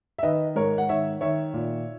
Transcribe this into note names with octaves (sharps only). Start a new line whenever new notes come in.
E5
D#3 B4 D#5
G#2 A#4 C#5
F#5
D#3 C#5 E5
D#3 C#5 E5
A#2